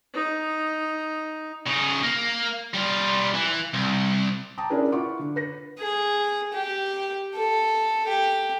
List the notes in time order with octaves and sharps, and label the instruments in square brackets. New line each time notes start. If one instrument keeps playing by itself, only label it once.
[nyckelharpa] D#4
[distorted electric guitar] C#3 D#4
A#3
G3 F4
E3
C2
[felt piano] G5 A5 A#5 D6 D#6
C#4 D4 E4 G#4 A#4 B4
E4 F4 F#5 C#6 D6
D3
B4 A#6
[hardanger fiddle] G#4
G4
A4
G4